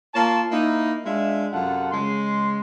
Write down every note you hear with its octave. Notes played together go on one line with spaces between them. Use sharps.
A#3 F4 C#5 A5
A#3 D#4 E4
G#3 D4 F4 E5
F#2 C3 F4 A4 F#5 A5
C#3 G#3 C6